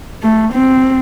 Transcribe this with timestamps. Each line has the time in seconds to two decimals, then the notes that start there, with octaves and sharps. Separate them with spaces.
0.23 A3
0.53 C4